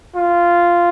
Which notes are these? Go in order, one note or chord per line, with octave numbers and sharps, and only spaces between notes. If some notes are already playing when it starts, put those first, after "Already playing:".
F4